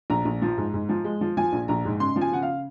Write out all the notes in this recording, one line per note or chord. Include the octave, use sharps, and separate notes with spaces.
A#1 A#5
A#1
F3
G#2
G#2
F3
G#3
F3
F3 G#5
A#1
A#1 A#5
G#2
C#3 C6
F3
G#5
C#3 F#5
F5